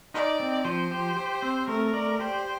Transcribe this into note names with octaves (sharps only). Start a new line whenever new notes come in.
D#4 D5
C4
F3 C5
G4
G4
C4
A3 A#4
D5
G4 C5